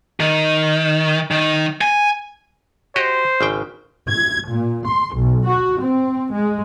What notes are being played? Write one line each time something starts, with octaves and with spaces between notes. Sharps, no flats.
D#3
D#3
G#5
F#4 G4 C5 D#5
G#1 C#3 G5
G#6
A#2
C6
B1
F#4
C4
G#3